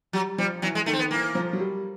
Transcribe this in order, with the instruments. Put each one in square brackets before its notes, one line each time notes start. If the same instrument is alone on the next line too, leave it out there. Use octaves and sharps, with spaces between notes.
[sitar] F#3 [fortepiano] G3
[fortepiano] F3 [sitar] G3
[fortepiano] E3 [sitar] F#3
[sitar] G#3
[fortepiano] D#3 [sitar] A3
[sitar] C4
B3
[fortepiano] E3 [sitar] A#3
[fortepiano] F3
F#3
G3